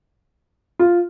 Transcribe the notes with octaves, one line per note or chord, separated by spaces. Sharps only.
F4